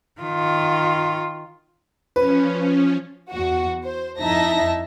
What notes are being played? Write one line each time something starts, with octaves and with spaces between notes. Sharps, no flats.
D#3 F4
F3 C#4 B4
E2 F#4
C5
F2 D#4 E4 E5 A5 A#6